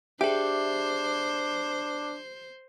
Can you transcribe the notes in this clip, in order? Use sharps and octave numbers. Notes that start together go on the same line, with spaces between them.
D4 G4 G#4 C5 E5